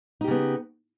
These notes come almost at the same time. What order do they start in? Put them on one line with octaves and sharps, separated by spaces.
D#4 G4 C#3 B3